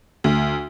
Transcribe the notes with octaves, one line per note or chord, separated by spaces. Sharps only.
D2